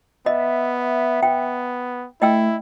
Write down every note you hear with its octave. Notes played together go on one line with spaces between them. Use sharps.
B3 D#5 E5
B3 G5
A3 E4 D#5 G5 E6